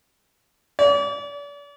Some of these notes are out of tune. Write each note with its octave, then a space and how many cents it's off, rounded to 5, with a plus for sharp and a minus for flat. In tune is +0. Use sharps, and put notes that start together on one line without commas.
D5 -40